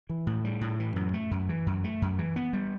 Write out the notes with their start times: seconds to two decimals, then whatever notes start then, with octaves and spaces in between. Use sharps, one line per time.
0.09 E3
0.27 A2
0.45 G3
0.61 A2
0.80 E3
0.96 F#2
1.14 A3
1.31 F#2
1.49 E3
1.66 F#2
1.84 A3
2.02 F#2
2.19 E3
2.36 B3
2.53 G3